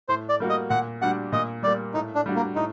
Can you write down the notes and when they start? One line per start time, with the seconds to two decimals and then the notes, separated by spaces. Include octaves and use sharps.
0.09 A2 C5
0.29 D5
0.40 G3 A#3 F#4
0.49 D#5
0.70 A#2 F#5
1.02 G3 D4 F#4 F#5
1.32 A#2 D#5
1.63 G3 A#3 D5
1.94 A2 D#4
2.15 D4
2.26 G3 D4 F#4
2.36 A#3
2.55 A2 D#4